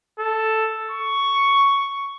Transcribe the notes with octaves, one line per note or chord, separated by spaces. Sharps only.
A4
C#6